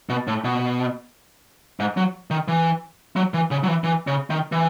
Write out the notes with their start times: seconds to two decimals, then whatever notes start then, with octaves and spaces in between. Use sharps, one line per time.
0.09 B2
0.27 A2
0.44 B2
1.80 G#2
1.97 F#3
2.31 D#3
2.48 E3
3.16 F#3
3.34 E3
3.51 C#3
3.63 F#3
3.68 E3
3.84 E3
4.07 C#3
4.30 D#3
4.52 E3